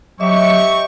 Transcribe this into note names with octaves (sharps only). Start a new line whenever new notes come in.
F#3 C4 G4 D#5 E5 C#6